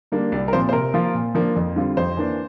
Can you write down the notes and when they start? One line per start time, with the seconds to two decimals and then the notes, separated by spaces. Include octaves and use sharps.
0.12 D3 G3 A#3 D4
0.32 C2 D5
0.48 A#4
0.53 A#2 F3 C4 C5
0.69 C5
0.73 C3 A#4
0.94 F3 A#3 F4
1.14 A#2
1.35 F3 A#3 D4
1.56 F2
1.76 D3 G3 C4 F4
1.97 F2 C5
2.17 E3 A#3 D4